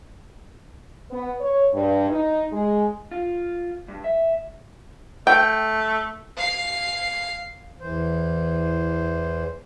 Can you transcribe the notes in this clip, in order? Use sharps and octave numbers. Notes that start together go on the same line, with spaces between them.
B3
C#5
G2
D#4
G#3
F4
G2
E5
A3 G5
F5 C7
E2 E3 C5